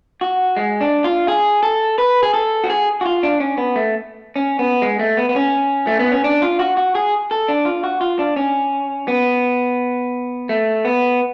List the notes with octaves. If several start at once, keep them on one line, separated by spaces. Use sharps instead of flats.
F#4
G#3
D4
F4
G#4
A4
B4
G#4
A4
F#4
G#4
F#4
F4
D4
C#4
B3
A3
C#4
B3
G#3
A3
B3
B3
C#4
A3
B3
C#4
D4
F4
F#4
F#4
G#4
A4
D4
F4
F#4
F4
D4
C#4
B3
A3
B3